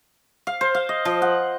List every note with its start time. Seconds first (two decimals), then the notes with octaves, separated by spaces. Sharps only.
0.47 F5
0.61 C5
0.75 F5
0.89 D#5
1.05 F3
1.22 F#5